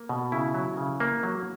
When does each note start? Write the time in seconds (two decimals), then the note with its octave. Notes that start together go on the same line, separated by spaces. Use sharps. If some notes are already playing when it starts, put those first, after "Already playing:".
Already playing: A#3
0.09 B2
0.32 C#3 E4
0.54 F#3
0.77 C#3
1.00 A#3
1.23 F#3